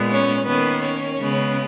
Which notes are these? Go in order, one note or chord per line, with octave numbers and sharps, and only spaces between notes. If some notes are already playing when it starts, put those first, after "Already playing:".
Already playing: A#2 G#3 B3
C#4 C#5
D#3 A#3 B3 C#4 B4
C#4 C#5
C#3 G#3 B3